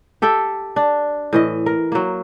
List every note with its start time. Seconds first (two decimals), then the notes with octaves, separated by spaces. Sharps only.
0.22 G4 A4 E5 G5
0.76 D4
1.33 A2 E3 D#5
1.66 A#4
1.92 F#3 A#3